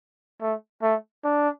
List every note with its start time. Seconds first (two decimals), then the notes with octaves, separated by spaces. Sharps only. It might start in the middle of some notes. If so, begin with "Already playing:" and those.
0.42 A3
0.82 A3
1.24 D4